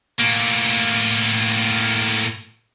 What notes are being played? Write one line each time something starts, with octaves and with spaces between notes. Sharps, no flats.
A2 A#3